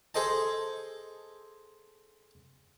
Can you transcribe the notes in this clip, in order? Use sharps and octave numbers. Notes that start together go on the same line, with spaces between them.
G#4 A4 C5 D#5 A5